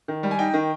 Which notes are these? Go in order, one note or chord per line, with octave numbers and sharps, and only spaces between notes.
D#3
G3
G#5
D#4 G5
D#3